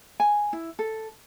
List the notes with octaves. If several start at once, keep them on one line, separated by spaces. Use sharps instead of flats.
G#5
E4
A4